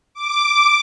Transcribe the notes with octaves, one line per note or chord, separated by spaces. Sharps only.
D6